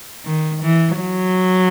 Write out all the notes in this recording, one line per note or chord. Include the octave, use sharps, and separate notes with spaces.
D#3
E3
F#3